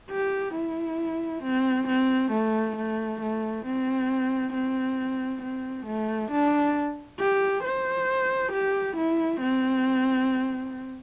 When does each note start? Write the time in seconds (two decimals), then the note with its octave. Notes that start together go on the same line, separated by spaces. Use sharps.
0.11 G4
0.55 E4
1.43 C4
1.88 C4
2.31 A3
2.76 A3
3.21 A3
3.65 C4
4.53 C4
5.42 C4
5.86 A3
6.31 D4
7.19 G4
7.64 C5
8.52 G4
8.96 E4
9.41 C4